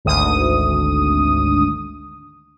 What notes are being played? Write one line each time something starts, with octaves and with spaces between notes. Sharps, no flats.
G#1 D2 D#6